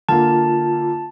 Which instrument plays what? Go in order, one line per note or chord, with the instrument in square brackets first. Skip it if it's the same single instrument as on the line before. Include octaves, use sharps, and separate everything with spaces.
[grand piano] D3 A#3 [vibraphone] F4 [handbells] A5